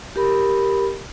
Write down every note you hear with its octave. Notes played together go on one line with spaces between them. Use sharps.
G4 A#4 B5